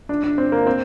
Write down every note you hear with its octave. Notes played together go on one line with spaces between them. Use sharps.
D4
D4
C4
A#3
C4